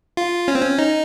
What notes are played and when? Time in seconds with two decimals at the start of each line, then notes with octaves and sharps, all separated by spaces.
0.17 F4
0.48 C#4
0.55 C4
0.61 C#4
0.78 D#4